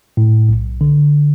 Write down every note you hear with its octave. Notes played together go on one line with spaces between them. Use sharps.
A2
B1
D3